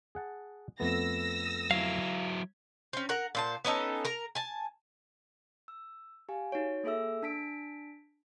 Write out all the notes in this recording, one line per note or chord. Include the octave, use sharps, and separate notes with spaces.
G#4 F#5 A5
F2 A3 B3 E6 A#6
F#3 E4 F5
C4 C#4
A#4 F#5 A#5
A#2 C5 A5
B3 C#4 D#4 A4
A#4 A#5
G#5 A5
E6
G4 F5 G#5
D#4 F#4 C#5
A#3 G#4 A4 E5 E6
D4 A5 B6 D7